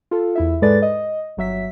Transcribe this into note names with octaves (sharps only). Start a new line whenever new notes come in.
F4 A4
E2 E4 E5
G#2 G#3 A4 B4 D5 A6
D#5
G1 F#3 E5 B6